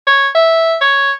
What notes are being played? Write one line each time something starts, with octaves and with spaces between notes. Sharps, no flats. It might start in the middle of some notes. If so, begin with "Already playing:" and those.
C#5
E5
C#5